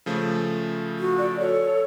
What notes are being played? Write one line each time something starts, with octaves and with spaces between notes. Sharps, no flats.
C#3 F3 A3
F#4
D5
A4 C#5